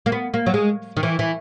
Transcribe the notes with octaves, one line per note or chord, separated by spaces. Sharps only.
A#3
B3
A#3
F#3
G#3
D#3
E3
E3